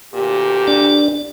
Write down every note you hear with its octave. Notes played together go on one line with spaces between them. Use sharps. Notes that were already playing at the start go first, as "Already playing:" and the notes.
D2 A#2 G4
D4 D5